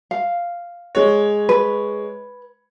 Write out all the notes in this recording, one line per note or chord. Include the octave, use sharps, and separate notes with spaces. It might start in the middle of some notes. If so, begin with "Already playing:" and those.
F5
G#3 C#5
B4